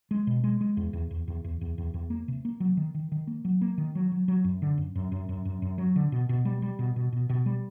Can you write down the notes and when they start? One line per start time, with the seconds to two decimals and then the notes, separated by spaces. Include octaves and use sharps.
0.11 G#3
0.27 B2
0.44 G#3
0.61 G#3
0.77 E2
0.93 E2
1.11 E2
1.28 E2
1.44 E2
1.61 E2
1.78 E2
1.94 E2
2.10 A#3
2.28 C3
2.45 A#3
2.60 F#3
2.77 D#3
2.94 D#3
3.12 D#3
3.27 A#3
3.45 F#3
3.61 A#3
3.78 D#3
3.95 F#3
4.12 F#3
4.28 F#3
4.44 F#2
4.62 D3
4.78 F#2
4.95 F#2
5.12 F#2
5.29 F#2
5.45 F#2
5.62 F#2
5.78 F#3
5.96 D3
6.12 B2
6.29 B2
6.45 G3
6.62 G3
6.79 B2
6.96 B2
7.12 B2
7.29 B2
7.46 G3